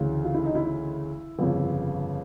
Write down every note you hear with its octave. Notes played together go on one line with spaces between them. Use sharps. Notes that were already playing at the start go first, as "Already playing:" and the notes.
Already playing: D2 C#3 E3
F4
E4
D#4
E4
G1 F2 C#3